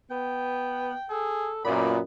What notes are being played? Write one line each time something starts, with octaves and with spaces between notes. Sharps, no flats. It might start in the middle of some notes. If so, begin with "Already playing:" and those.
B3 G5
G#4 A4
F#2 A#2 B3 D5 B5